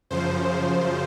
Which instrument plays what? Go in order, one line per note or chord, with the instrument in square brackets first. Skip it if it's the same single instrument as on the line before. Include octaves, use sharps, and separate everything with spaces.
[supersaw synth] F#2 C#3 F3 C5